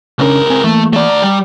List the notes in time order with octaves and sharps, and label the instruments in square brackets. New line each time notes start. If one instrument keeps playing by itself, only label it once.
[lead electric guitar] C#2 A#4 [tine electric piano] C#3 C#4 D4
[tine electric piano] C4 G#5
[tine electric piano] E3 A#3 [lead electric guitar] A3
[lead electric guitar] A3 D5
[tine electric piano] A#5
[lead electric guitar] G3